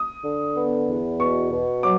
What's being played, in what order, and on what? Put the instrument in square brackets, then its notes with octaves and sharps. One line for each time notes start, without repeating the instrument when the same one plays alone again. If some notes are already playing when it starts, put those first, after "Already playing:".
Already playing: [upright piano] D#6
[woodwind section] D3
B3
E2
[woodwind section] B2 [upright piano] C#6
[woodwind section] B2
[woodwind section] F#3 [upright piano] D6